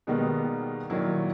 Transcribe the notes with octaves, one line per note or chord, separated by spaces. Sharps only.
B2 D#3 G3 G#3 A#3 B3
A#2 D#3 F#3 E4